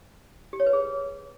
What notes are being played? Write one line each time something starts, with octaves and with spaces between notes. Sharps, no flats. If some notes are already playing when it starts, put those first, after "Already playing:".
G4
C#5
B4
G#4